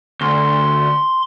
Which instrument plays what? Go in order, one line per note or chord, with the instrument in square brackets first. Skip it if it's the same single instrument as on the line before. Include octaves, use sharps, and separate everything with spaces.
[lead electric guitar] D2 [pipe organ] C6